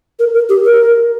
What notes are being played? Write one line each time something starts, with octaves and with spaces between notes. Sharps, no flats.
A#4
A#4
G4
A#4